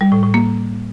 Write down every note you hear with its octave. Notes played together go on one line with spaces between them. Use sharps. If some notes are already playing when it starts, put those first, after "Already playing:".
G3
A2
A2
A#3